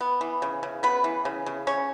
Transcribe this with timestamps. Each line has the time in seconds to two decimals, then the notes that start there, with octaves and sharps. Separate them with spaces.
0.01 B3
0.21 E3
0.42 C#3
0.63 C#3
0.83 B3 B4
1.04 E3
1.25 C#3
1.46 C#3
1.67 C#4 C#5